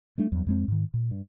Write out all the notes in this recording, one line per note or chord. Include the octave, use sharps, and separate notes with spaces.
G3 A3 D4
E2 G2 F#3
F2 G#3 C4
G#2 D#3
A#2
G2